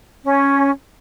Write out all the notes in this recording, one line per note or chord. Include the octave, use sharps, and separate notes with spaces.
C#4